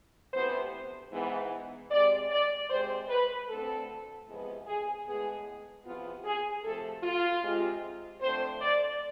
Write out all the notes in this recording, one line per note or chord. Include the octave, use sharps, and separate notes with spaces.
D2 C3 E3 B3 C5
G#2 E3 B3
C3 G#3 C4 D5
D5
C3 G#3 C4 C5
B4
D2 D3 A3 C4 A4
E2 C3 F3 G#3 B3
G#4
A2 G#3 B3 G#4
E2 C3 F3 B3 F4
G#4
C3 F3 A3 A4
F4
C3 G#3 C4
F2 D3 A3 C4 C5
D5